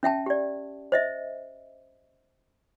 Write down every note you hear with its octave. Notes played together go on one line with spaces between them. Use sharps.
C#4 E5 G5 A5
G4 D5
C5 D#5 E5